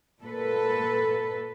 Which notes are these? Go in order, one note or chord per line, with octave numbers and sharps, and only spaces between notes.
A#2 A4 B4